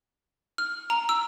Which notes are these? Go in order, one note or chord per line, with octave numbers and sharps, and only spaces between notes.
F6
A#5
E6